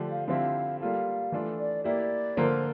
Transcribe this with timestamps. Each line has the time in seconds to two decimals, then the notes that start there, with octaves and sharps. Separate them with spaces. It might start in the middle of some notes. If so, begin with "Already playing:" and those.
Already playing: D3 F3 A3 D4 G4
0.11 F5
0.28 D3 F3 C4 E4 G4 F5
0.80 G3 A#3 F4 A4 F5
1.32 E3 A3 D4 F4 A4
1.59 D5
1.84 A#3 E4 G4 D5
2.37 D3 F3 A#3 F4 A#4 C5